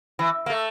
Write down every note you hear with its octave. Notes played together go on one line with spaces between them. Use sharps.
E3
A#3
A3